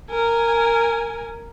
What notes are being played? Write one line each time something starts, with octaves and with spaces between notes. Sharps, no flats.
A#4 G#5